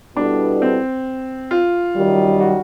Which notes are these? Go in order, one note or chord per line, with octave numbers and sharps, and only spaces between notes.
B2 G3 B3 D4 E4 A4
C4
F4
F#2 D#3 G3
F#4